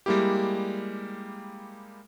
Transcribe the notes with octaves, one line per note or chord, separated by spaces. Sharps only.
G3 G#3 A#3 E4 G4